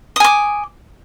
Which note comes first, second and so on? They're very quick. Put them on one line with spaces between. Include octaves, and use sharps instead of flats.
D#6 G#5 D6